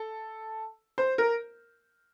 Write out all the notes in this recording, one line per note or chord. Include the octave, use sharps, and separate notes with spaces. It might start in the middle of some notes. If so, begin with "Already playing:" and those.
Already playing: A4
C5
A#4